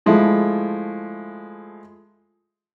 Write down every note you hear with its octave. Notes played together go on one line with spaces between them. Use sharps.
F3 G#3 A3 E4